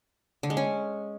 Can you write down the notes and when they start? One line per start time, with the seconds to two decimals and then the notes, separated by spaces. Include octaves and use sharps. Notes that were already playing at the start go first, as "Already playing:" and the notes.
0.43 D3
0.50 G#3
0.57 C#4